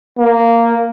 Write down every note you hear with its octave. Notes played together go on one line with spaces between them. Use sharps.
A#3